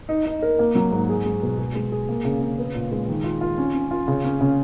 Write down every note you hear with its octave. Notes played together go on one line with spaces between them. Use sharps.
D#4
D#4
A#4
A#3
F#3
G#2
G#4
G#3
B2
G#4
G#3
G#4
A#3
C#3
C#3
B3
A#2
G#3
D#3
F4
F4
C#4
C#4
F4
C#3
C#4
C#3